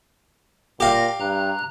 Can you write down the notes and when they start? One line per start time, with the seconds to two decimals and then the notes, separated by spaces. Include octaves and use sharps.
0.80 A#2 G4 F5 A#6
1.20 G2 A#5 F#6